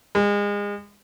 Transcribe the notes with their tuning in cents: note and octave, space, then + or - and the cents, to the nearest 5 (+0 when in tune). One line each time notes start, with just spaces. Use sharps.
G#3 -30